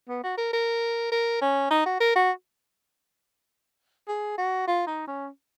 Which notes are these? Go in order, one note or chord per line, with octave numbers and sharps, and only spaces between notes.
B3
F#4
A#4
A#4
A#4
C#4
D#4
F#4
A#4
F#4
G#4
F#4
F4
D#4
C#4